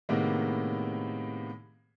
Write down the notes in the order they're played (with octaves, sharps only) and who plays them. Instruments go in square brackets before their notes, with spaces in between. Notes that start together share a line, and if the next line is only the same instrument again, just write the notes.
[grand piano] A2 C3 D#3 G#3 A#3 B3